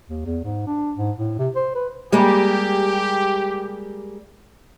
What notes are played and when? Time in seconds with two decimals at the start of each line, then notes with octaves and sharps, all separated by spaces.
0.09 D#2
0.25 E2
0.44 G#2
0.66 D4
0.97 G#2
1.17 A2
1.38 C3
1.56 C5
1.75 B4
2.12 G3 G#3 A#3 G4